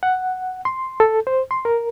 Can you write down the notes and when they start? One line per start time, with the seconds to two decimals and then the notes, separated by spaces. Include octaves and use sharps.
0.03 F#5
0.65 C6
1.00 A4
1.27 C5
1.51 C6
1.65 A#4